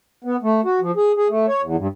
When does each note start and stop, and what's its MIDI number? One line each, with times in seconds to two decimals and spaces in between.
0.24 0.36 59
0.43 0.61 57
0.65 0.80 66
0.81 0.91 53
0.96 1.12 68
1.17 1.28 68
1.29 1.46 57
1.48 1.62 73
1.62 1.76 40
1.77 1.87 43